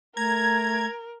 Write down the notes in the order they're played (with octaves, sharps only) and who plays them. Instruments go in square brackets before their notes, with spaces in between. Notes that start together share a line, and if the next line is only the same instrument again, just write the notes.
[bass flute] A3 [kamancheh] A#4 [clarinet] A#5 [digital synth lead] G#6